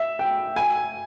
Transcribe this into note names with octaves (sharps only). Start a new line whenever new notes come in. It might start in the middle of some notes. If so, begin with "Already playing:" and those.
Already playing: E5
G5
G#5